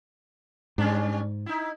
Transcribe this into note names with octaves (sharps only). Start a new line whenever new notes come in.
G#2 G3 C#4 D4
D#4 E4